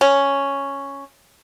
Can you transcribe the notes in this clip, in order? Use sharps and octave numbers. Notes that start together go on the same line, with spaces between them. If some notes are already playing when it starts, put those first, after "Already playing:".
C#4